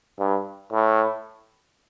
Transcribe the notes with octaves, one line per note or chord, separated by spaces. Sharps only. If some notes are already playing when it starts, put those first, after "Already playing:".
G2
A2